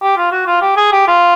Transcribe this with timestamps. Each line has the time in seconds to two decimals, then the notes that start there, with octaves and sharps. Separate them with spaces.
0.02 G4
0.17 F4
0.32 F#4
0.47 F4
0.62 G4
0.77 G#4
0.92 G4
1.08 F4